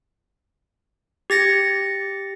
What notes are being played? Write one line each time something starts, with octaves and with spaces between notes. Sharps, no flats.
G4 A6 A#6 C#7